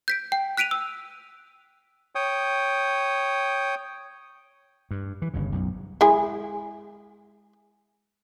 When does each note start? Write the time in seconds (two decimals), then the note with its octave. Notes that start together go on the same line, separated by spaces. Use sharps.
0.08 G6 B6 D7
0.32 G5
0.57 F#6 B6 D7 D#7 F7
0.71 E6
2.15 C#5 G5 D#6
4.91 G2
5.22 E3
5.34 G1 G2 C#3
5.52 B1 F#2
6.01 G#3 E4 G#4